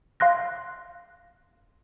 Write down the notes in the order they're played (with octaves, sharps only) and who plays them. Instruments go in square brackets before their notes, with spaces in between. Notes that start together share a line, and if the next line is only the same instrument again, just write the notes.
[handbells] F5 C6 F#6 A#6